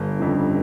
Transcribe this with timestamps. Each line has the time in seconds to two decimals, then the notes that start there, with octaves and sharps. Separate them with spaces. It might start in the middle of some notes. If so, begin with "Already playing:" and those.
Already playing: G1 G2
0.20 F2 C#3